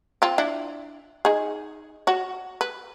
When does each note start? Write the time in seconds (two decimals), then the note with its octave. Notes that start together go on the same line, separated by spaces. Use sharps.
0.22 C4 F4
0.38 D4 E4
1.25 D#4 G#4
2.07 F#4 C#5
2.61 B4